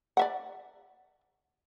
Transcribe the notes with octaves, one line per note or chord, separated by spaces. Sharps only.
D5 E5 F#5